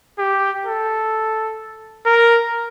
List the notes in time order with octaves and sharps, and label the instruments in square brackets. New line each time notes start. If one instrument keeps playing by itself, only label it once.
[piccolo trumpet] G4
A4
A#4